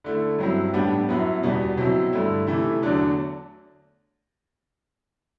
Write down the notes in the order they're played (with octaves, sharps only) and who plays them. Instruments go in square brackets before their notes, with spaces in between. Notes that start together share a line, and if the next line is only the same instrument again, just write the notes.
[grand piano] D3 A3 E4
G2 F#3 C4 E4
A2 G3 B3 D4
F#2 F#3 B3 E4
E2 B2 G3 B3
B2 F#3 C4 E4
G2 D3 A3 E4
C3 E3 A3 E4
E2 D3 F#3 A3 D4